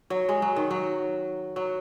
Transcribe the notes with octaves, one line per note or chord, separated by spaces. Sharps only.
F#3
G#3
F#3
D#3
F#3
F#3